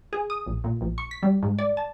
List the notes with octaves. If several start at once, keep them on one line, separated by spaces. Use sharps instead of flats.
G#4
D#6
A#1
A#2
A#1
C#6
B6
G3
G#2
D5
A5